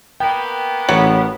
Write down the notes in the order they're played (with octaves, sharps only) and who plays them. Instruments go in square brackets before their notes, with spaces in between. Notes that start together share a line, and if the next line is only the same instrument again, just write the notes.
[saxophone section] A#3 B3 [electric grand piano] G5
[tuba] A1 [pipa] F#3